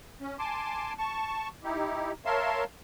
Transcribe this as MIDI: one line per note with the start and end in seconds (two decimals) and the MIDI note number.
0.21 0.36 61
0.39 0.93 80
0.39 0.93 81
0.39 0.93 84
0.39 0.93 86
0.98 1.49 81
0.98 1.49 85
1.64 2.12 63
1.64 2.12 64
1.64 2.12 67
2.25 2.64 70
2.25 2.64 73
2.25 2.64 76
2.25 2.64 77
2.25 2.64 81
2.25 2.64 84